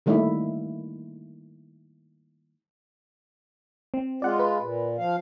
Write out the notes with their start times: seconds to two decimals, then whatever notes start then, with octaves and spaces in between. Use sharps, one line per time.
0.06 D#3 G3 A3 A#3 D#4 E4
3.94 C4
4.22 G#3 F4 D5 F#5
4.39 B4
4.59 A#2
4.98 F3 F5